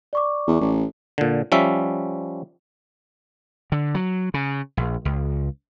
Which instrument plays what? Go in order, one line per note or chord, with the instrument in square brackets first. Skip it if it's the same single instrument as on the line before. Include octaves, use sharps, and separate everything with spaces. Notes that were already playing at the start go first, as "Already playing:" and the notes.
[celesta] D5 C#6 D6
[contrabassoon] E2
A1
[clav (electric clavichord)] A#2 D3
F3 G3 C#4 E5
[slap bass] D3
F#3
C#3
A#1
C#2